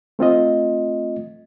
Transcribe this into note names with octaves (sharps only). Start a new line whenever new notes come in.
A3 C4 F4 D#5